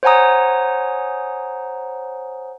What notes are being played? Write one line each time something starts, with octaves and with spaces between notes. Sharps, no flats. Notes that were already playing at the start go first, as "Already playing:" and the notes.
C5 C#5 F#5 G#5 A#5 D#6